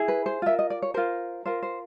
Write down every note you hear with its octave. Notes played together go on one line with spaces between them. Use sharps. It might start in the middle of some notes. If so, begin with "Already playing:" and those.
Already playing: E4 G#4
B4
C5
F4 A#4 E5
D#5
D5
C#5
F4 A#4 C5
F4 A#4 C5
C5